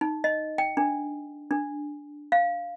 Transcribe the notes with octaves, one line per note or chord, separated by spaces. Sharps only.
D#4
D#5
G5
D4
D4
F5